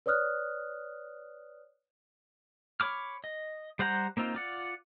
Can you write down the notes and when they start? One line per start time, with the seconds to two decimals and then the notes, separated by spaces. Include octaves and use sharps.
0.06 B4 C#5 D5 D#6 F6 F#6
2.80 C#5 B5 D6 F6
3.24 D#5
3.79 G3 C5 F#5 A#5 G6
4.17 A#3 C4 D#4 F4
4.35 F4 D5 F#5